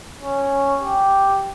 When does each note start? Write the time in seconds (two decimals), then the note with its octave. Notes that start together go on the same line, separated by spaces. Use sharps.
0.21 C#4
0.80 G4